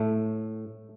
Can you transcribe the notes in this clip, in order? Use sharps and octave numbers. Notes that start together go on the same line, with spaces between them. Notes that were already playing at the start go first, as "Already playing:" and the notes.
Already playing: A2 A3